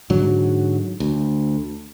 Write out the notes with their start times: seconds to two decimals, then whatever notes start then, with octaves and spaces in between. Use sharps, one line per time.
0.10 G#2 D3 F#3
1.00 D2